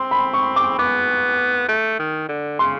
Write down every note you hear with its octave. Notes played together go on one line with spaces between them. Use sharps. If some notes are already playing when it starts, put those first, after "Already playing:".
Already playing: C4 C6
B5
C#6
D6
B3 D6
A3
D#3
D3
C#3 C6